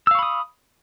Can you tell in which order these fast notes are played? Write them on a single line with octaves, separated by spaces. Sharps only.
E6 F5 C#6 B5 D#6